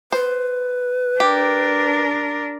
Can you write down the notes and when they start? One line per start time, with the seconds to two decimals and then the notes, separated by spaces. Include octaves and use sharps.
0.12 B4 C5
1.20 D4 G4 A#4